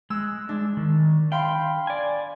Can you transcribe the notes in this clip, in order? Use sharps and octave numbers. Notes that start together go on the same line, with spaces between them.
G#3 E6 F#6
D4
D#3
F5 G5 B5 C6
D5 G#5